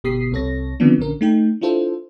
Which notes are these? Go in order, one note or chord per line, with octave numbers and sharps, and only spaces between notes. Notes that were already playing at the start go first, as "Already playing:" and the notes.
G1 B2 G4 D#6 B6 C7
C2 C3 A4 C#5 A#6
D3 D#3 F3 B3 C4 D4
A#1 D3 C#4 A#4
A3 D#4 G5
D4 E4 F4 A4 C5